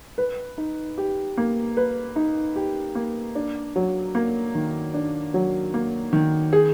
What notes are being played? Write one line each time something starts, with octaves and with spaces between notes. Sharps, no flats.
B4
D#4
G4
A#3
B4
D#4
G4
A#3
D4
F#3
A#3
D#3
D4
F#3
A#3
D#3
G#4